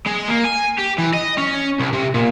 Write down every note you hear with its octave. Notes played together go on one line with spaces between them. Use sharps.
G#3
A#3
G#5
G4
E3
D#5
C#4
C2
C3
A#2